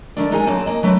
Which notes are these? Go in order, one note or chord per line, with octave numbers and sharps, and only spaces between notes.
D#3 A3 D4
G#3 D#4 E4 G#4 A#4 G#5
F#3 A#3 C4 A5
A#3 D#5
F#3 A3 C4 B4